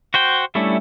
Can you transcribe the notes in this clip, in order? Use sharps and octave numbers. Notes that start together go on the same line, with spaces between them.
F#4 C5 G5
G3 A3 C#4 D4 E4